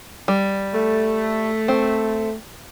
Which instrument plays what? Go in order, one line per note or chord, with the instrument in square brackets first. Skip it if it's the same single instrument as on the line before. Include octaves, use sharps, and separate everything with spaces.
[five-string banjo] G3
[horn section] A3
[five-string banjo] C4